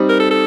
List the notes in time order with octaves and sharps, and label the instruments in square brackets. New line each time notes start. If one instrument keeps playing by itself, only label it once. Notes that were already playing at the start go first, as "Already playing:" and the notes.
Already playing: [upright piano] G3 C4 D#4
[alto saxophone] A#4
A4
A4